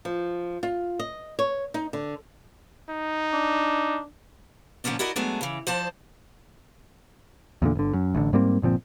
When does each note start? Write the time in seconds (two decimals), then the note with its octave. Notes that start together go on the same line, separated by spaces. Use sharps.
0.05 F3
0.63 F4
0.99 D#5
1.39 C#5
1.74 D#4
1.93 D3
2.89 D#4
3.33 D4
4.84 A#2 D3 F3 C#4 D4
4.99 E4 F#4 A#4 D5 D#5
5.16 F#3 G#3 A3 B3 D4
5.41 C#3 E3
5.67 F3 C5 D5 A5
7.62 E2 A#2 D3
7.75 G1 D3
7.93 F#2
8.15 A1 D3
8.33 G#2 G3 A#3 C4
8.62 G1 A#2 F3 C4